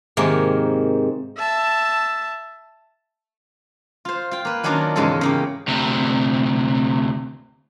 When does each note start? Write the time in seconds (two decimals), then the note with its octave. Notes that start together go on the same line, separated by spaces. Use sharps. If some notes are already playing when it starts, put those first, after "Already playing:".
0.17 G#2 C3 D#3 A#3
1.38 E5 A5
4.05 F4 C5
4.31 F4 G5
4.45 A#3 B4
4.63 D#3 F#3 A#3 C#4 D4 F4
4.96 E2 G#2 C#3 G#3 F4 A4
5.21 C#3 A#3 G4
5.68 D2 C3